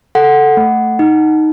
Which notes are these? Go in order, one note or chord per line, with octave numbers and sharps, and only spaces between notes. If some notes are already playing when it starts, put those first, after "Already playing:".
A4 F#5
A3
D#4